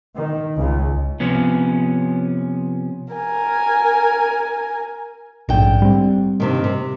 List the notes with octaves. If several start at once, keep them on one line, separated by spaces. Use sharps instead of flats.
D#3
C#2
C3 F3 B3 C#4
A#4 G#5
A#1 G#2 D3 G5
G3 C4
G2 C3 D#3
C3